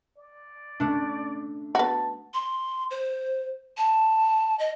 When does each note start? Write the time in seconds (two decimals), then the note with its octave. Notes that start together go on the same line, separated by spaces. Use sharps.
0.18 D5
0.80 A3 D4
1.75 B3 F#4 A5
2.34 C6
2.91 C5
3.77 A5
4.59 D#5